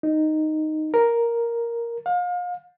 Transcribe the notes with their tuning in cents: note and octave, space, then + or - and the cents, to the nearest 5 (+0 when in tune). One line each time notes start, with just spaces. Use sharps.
D#4 -5
A#4 +5
F5 +35